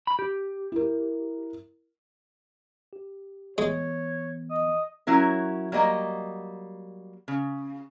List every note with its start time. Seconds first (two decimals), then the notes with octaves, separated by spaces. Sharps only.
0.07 B5
0.19 G4
0.72 E4 A#4
2.93 G4
3.58 E3 G#3 B3 C#5
4.50 D#5
5.07 F#3 C#4 E4 A#4
5.72 F#3 G3 A#3 D#5
7.28 C#3